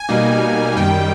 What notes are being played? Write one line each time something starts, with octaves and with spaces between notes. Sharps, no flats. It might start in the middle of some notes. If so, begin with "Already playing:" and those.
Already playing: G#5
B2 G3 A#3 D#4
F#2 D#3 G3 G5